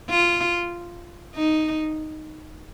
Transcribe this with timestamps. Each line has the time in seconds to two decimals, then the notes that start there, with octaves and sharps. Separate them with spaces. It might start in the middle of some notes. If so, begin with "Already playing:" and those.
0.10 F4
1.36 D#4